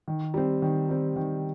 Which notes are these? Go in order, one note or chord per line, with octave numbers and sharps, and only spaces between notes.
D#3
G3 C4
D#3
G3 C4
D#3